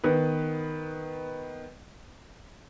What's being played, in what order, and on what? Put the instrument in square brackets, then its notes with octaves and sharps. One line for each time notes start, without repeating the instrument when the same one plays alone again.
[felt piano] D#3 B3 B4